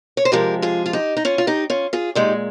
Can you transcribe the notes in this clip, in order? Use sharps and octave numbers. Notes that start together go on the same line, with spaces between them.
C#5
C5
C3 F3 G#3 G4 A#4
F4 G#4
F4
D#4 G4
D#4
C#4 F4
F4
D#4 G4
C#4 F4
F4 G#4
A#2 G#3 D#4 G4